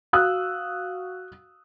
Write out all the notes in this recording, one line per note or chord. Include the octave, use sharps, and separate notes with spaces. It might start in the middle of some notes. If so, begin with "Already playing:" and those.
F#4 F5 D#6 E6 F#6